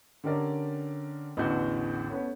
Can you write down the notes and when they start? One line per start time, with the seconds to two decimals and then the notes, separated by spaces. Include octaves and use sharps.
0.24 D3 C#4 G4 A#4 D5
1.37 A1 E2 A2 D3 F#4 G6
2.10 A3 B3 C#4